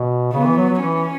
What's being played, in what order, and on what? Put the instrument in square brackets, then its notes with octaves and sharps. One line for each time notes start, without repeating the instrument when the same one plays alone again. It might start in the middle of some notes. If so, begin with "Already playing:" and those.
Already playing: [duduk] B2
[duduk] C#3 [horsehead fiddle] B3
[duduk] E3
F#3
F#3
[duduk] E3 [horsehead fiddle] C#4